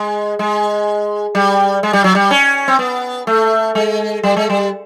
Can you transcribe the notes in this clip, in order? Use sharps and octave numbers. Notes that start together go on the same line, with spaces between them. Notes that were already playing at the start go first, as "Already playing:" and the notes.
Already playing: G#3
G#3
G3
G#3
G3
F#3
G3
C#4
C4
B3
A3
G#3
G3
G#3
G3